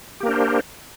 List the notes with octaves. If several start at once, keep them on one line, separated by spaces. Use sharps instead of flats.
A#3 D4 G4 A#4 C5